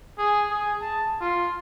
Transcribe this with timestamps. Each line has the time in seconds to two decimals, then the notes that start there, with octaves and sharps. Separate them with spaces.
0.18 G#4
0.50 G#4
0.81 A5
1.21 F4